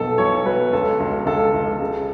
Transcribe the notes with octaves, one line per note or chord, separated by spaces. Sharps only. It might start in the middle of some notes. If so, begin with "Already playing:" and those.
Already playing: B1 B2 A4
B1 C#5
F#3 B4
C#2 A4
C#2
C#2 A4
C#2
C#3